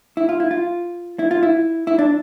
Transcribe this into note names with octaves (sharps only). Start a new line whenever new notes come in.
E4
F4
E4
F4
E4
F4
E4
E4
D4